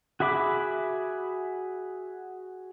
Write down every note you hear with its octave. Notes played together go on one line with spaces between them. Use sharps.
F#4 G#4 E5 B5 D6